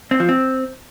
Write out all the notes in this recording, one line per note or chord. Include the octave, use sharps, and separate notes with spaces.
C4
F3
C4